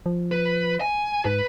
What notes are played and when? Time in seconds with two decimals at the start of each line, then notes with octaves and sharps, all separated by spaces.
0.06 F3
0.32 B4
0.81 G#5
1.25 G#2 B4